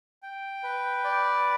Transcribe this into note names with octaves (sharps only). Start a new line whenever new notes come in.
G5
B4
D5